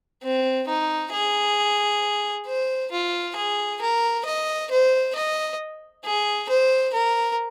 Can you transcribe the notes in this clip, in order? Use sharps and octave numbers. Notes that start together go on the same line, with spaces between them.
C4
D#4
G#4
C5
F4
G#4
A#4
D#5
C5
D#5
G#4
C5
A#4